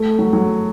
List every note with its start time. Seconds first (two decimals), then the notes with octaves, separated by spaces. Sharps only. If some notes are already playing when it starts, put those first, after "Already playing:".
Already playing: A3
0.19 F#3
0.33 F#3